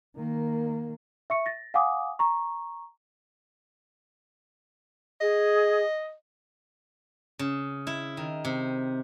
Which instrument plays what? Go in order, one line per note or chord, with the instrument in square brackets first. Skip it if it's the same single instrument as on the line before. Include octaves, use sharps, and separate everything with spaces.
[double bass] D#3 A#3
[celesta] E5 C#6 C#7
A6 A#6
F5 F#5 G#5 D6 D#6
A#5 C#6
[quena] G#4 [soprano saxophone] D#5
[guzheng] C#3
E4
D#3
C3